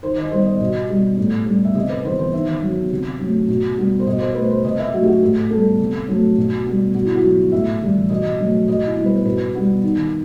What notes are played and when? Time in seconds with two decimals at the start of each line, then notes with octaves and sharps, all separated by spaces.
0.03 D#3 C5
0.17 D#5
0.31 G3 B3 C5
0.46 D#5
0.60 B2
0.89 G3 B3
1.17 A2
1.46 G3 B3
1.65 E5
1.75 C3 D#5
1.89 B4
2.04 E3 B3 C5
2.19 C5
2.33 D#3 E5
2.62 F#3 B3
2.91 C3
3.19 F#3 A3
3.48 B2
3.77 G3 B3
3.99 C5
4.06 B2 D#5
4.21 C5
4.35 A3 B4
4.50 C5
4.64 C3 D#5
4.79 E5
4.92 F#3 A3 F#4
5.03 G4
5.08 F#4
5.22 A2 G4
5.50 G3 B3 A4
5.80 C3
6.08 F#3 A3
6.37 B2
6.66 G3 B3
6.94 B2 F#4
7.05 E4
7.15 F#4
7.23 F#3 B3
7.52 A2 E5
7.82 E3 G3
8.09 B2 D#5
8.40 F#3 A3
8.68 B2 D#5
8.87 E4
8.96 G3 B3
9.06 B4
9.25 B2 B4
9.55 G3 B3
9.83 D#3